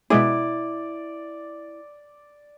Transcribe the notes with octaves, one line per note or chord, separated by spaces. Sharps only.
B2 G#3 E4 G#4 D5